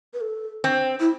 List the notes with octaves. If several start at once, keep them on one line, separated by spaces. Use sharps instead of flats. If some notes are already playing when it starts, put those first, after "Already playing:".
B4
A4
C4
E4